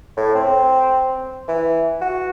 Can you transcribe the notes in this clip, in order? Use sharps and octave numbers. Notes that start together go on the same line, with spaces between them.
A2
C4
E3
F#4